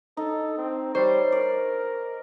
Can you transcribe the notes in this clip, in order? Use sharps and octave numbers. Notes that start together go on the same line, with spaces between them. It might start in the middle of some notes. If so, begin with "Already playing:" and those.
D#4 A4
C4
G3 C5 C#5
A#4 D5